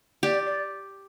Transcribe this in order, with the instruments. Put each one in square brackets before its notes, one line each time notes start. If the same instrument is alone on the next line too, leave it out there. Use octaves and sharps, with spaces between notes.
[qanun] G4 [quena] D5
[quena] D5